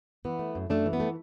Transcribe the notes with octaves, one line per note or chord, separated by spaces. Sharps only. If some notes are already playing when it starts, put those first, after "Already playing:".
E3 B3
A3
F#2
F#2 A3 D4
E3
B3
A3